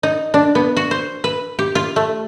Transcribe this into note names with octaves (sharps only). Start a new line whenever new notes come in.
D#4
D4
B3
F#4
C5
B4
G4
F4
A3